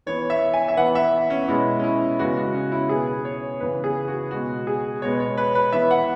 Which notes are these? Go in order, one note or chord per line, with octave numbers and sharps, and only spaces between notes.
E3 B3 C#5
E5
G#5
E5
E3 B3 F#5
E5
C#4
B2 G#3 B3 E4
C#4
E4
C#3 G#3 B3 F#4
F#4
C#4
E4
B2 B3 G#4
C#5
C#3 E3 B3 B4
G#4
F#4
B2 G#3 B3 F#4
G#4
B2 G#3 B3 C#5
C#5
B4
B4
E3 B3 E5
F#5